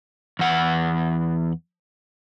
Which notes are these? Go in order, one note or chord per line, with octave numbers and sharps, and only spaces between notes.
E2 F#5